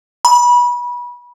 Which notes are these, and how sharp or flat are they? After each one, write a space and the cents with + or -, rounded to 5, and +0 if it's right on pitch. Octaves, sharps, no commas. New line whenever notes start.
B5 -25